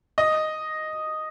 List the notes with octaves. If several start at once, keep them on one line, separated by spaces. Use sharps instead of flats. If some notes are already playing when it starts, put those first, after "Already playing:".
D#5